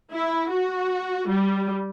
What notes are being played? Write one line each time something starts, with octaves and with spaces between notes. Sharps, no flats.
E4
F#4
G3